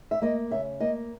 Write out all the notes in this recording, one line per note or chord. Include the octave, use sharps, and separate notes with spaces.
E5
A#3 D#5
C#3 E5
A#3 D#5